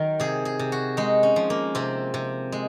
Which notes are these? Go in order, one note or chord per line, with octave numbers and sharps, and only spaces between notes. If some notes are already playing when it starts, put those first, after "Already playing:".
Already playing: D#3 F#3 A#4
C3 G#4
G#4
C3
F#4
G#3 D#4
C#4
F3
A#3
C3 C4
C3
G#3